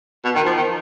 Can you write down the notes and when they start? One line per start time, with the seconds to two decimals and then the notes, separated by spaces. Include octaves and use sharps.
0.24 B2
0.35 D#3
0.46 F3
0.57 D#3